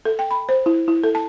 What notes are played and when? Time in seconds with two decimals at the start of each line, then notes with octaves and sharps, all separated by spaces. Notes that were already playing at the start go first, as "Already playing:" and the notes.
0.05 A4
0.19 G5
0.31 B5
0.49 C5
0.66 E4
0.88 E4
1.04 A4
1.15 A5